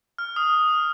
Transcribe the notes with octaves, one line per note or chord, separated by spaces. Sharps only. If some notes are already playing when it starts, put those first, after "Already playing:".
F6
D#6